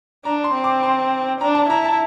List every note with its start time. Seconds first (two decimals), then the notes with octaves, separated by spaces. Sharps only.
0.25 D4 A#5
0.44 C6
0.54 C4
0.64 D6
0.83 C6
1.41 D4 A#5
1.55 A5
1.70 E4 A#5
1.85 A5